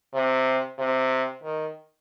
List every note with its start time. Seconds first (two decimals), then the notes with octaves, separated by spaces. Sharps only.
0.14 C3
0.78 C3
1.43 D#3